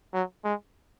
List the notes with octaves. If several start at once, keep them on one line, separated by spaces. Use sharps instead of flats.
F#3
G#3